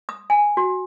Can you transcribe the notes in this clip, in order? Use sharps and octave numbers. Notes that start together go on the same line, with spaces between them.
D#6
G#5
F#4